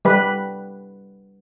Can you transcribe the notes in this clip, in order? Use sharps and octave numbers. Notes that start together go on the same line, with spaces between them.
G3 B4